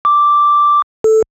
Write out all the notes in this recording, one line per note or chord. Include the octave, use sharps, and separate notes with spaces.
D6
A4